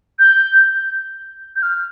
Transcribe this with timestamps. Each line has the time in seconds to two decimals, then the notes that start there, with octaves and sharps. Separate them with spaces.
0.19 G6
1.56 G6
1.63 F6